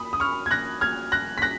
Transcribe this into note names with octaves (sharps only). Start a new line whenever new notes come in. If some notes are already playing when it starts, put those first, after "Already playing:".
Already playing: B5 D#6
D#6
C#6 F6
G#6
F#6 A#6
F6 G#6
F#6 A#6
B6
F#6 A#6